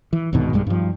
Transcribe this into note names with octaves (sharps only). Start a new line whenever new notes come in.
E3
C2 G#2 B2 D#3
A#1 G2 G3 G#3
G2 F3